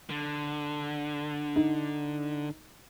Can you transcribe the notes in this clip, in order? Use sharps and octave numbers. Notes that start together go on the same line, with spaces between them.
D3
D#4